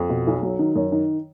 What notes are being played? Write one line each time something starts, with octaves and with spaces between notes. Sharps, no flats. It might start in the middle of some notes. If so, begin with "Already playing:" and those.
Already playing: F2
B2
B1
F#3
D#3
F#2
D#3